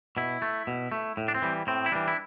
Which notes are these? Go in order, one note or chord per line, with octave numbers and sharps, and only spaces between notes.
B2 E4
A3
B2
A3
A2
D4
C4
E3 G3
A2 C4
E4
E3 G3 D4
E4